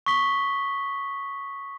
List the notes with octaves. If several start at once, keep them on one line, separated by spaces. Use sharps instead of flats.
C#6 D#6 B6 G7